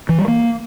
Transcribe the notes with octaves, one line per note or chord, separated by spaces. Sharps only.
E3
G3
A#3